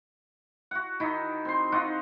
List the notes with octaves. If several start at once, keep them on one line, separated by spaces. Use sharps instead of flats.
F#4 F#5
D#3 D#4 E4
C4 C6
D#4 F4 F#4 F#5